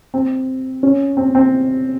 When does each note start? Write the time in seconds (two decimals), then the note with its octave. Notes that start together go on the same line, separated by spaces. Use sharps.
0.14 C4
0.83 C#4
1.17 C4
1.35 C4